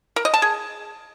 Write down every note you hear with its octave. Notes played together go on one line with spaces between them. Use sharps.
A#4
D#5
A5
G#4